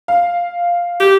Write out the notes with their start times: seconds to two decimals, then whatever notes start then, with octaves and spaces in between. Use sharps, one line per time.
0.08 F5
1.00 G4